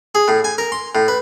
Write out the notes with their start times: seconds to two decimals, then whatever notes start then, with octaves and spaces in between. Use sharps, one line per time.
0.15 G#4
0.28 A2
0.44 G#5
0.58 A#4
0.72 C6
0.95 A2
1.08 B4